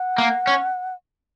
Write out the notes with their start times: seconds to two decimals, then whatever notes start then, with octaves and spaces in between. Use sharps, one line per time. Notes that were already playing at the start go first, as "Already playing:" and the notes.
Already playing: F#5
0.18 A#3
0.47 C#4